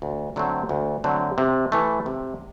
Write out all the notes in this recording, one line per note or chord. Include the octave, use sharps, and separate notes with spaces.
D2
D3 F#3 A3 C4
D2
D3 F#3 A3 C4
C3
E3 A3
C3